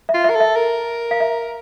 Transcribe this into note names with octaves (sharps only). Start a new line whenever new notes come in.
E5
F4
E5
A#4
A4
E5
A#4
F5
E5